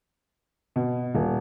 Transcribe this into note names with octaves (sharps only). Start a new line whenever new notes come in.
B2
D#1